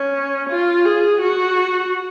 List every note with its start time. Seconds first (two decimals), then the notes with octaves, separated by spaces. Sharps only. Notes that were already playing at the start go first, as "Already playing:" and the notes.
Already playing: C#4
0.50 F4
0.85 G#4
1.22 F#4